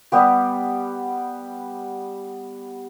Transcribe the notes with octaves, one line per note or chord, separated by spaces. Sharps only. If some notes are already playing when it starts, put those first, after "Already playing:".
G3 B3 G4